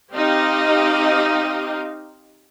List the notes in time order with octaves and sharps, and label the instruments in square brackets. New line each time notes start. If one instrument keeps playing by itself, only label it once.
[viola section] C4 D#4 G4 D#5 F5